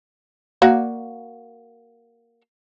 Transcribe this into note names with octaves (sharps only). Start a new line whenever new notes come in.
A#3 F#4 D5